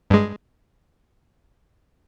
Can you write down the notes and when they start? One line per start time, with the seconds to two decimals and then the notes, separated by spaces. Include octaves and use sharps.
0.10 G2 G#3